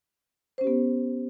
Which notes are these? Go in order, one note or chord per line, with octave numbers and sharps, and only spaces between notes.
B3 C#4 G4 C5